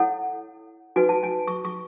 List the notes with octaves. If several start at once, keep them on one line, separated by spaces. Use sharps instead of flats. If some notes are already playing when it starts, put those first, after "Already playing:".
Already playing: E4 A4 C#5 F#5
D#4 F#4 B4 G#5
A5
G#5
C#6
C#6